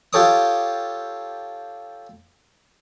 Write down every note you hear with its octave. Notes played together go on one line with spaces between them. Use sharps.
F4 G4 A4 C#5 D6 D#6